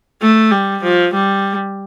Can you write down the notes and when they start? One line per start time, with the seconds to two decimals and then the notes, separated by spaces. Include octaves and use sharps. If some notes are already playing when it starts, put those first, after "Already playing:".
0.22 A3
0.52 G3
0.83 F3
1.13 G3